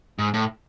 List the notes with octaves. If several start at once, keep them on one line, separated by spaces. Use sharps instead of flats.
G#2
A2